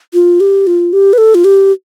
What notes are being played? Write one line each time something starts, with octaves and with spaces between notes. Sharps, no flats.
F4
G4
F4
G4
B4
A4
F4
G4